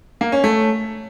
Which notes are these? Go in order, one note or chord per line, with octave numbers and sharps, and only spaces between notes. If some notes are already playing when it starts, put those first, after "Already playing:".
A#3
C#4
A3